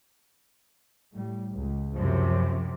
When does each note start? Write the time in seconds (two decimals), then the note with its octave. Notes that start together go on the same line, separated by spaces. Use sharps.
1.12 A2 G3
1.53 C#2
1.97 F#2 C3 F3